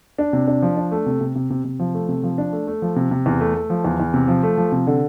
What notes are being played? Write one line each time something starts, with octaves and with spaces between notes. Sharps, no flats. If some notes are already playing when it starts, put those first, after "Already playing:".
D4
C3
D4
F3
D4
A3
C3
C3
C3
C3
C3
F3
A3
C3
F3
D4
A3
A3
F3
C3
C3
E2
A3
A3
F3
E2
E2
C3
F3
A3
F3
C3
D3